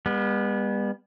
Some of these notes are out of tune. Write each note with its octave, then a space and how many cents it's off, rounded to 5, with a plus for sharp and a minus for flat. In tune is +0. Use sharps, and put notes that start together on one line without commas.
G3 +45 B3 -20